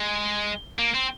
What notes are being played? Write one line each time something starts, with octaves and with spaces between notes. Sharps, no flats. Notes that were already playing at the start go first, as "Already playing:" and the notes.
Already playing: G#3
A#3
C4